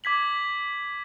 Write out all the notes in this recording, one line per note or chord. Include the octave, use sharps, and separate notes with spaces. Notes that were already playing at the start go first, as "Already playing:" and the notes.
D6 G#6 B6 F#7